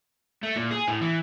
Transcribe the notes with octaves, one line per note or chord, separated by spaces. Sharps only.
A3
A#2
G#4
A2
E3